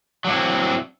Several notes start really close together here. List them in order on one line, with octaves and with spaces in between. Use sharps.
F#3 D4 E4 C4